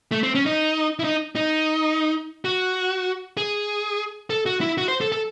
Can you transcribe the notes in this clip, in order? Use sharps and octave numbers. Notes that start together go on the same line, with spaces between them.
A3
C4
C#4
D#4
E4
D#4
D#4
F#4
G#4
A4
F#4
E4
F#4
C5
A4
A4